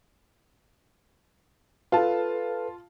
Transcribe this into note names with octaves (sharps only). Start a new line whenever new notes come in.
F4 A4 B4 A5